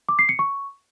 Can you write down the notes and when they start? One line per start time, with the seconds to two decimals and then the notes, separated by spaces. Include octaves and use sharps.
0.09 D6
0.19 C7
0.29 C#7
0.39 C#6